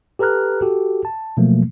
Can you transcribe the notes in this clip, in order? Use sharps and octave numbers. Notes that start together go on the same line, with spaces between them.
G4 A4 B4 A#5 F6 F#6
F#4 G4 A4
A5
B2 F3 F#3 A3 A#3